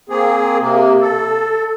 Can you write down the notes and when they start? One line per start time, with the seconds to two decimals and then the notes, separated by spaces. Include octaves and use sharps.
0.09 A#3 C4 G#4
0.60 C3 A#3
1.01 A4